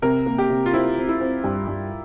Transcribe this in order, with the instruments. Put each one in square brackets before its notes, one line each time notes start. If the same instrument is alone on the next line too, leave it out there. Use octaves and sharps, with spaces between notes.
[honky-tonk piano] C3 [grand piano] A#4
[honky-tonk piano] A#3
[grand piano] G4
[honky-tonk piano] C3
[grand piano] F4
[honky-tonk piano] C4 [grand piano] E4
[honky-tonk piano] C4
[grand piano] E4
[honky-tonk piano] C4
G2
G2